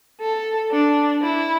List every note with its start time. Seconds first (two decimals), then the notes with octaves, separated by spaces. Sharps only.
0.21 A4
0.72 D4
1.22 E4